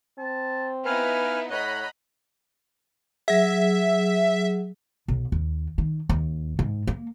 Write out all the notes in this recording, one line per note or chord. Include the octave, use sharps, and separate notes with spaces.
C4 A5
B3 D#4 E4 B4 F5 G#5 F6
A2 C#5 D#5 F#5 A#5 B5
F#3 G#4 E5
B1
D#2
D#3
D#2
G#2
A#3